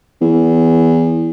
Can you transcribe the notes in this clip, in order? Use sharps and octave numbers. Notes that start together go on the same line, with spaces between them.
E2